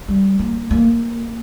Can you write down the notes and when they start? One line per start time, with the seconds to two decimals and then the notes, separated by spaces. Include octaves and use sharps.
0.08 G3
0.39 A#3
0.71 A#3